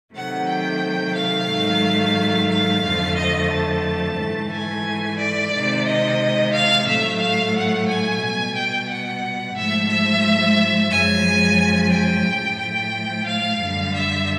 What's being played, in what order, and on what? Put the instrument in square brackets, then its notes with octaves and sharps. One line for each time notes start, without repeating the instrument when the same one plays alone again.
[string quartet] C3 D#3 F#3 A3 F#5
G5
F5
G#2 D#3 F#3 A3
F5
F2 D3 F3 A3
D#5
A5
G#2 E3 A3
G#5
D5
C3 D#3 G#3
D#5
F5
A2 F#3 A3 E5
F5
F#5
G#5
B2 G3
G5
F#5
G#2 F3 A3 E5
E5
F#2 C#3 F3 G#3 G#5
G5
A2 F3 A3
G5
F5
F#2 D3 G3
E5